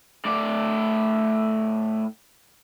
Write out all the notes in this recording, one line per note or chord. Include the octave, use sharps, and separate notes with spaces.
A2 D5